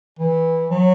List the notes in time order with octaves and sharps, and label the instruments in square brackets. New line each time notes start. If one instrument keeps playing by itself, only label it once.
[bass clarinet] E3
F#3